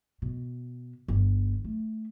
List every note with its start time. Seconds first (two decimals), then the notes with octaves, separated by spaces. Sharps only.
0.22 B2
1.08 G1
1.64 A3